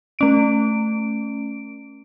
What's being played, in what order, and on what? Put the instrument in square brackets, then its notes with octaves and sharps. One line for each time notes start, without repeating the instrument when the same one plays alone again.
[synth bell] A3 C#4 D7